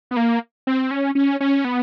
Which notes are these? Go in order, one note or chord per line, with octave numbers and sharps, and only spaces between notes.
B3
A#3
C4
C#4
C#4
C#4
B3